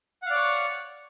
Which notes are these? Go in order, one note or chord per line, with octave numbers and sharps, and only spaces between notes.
C#5 D5 F5 F#5